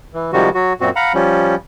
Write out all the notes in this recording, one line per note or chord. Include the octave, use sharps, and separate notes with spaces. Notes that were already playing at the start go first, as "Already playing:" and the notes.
E3
C3 D#3 F3 G3 G#3 F#4
F#3 F#4
F#2 A#2 C4 F#4
F5 F#5 A#5 B5
F3 G3 C#4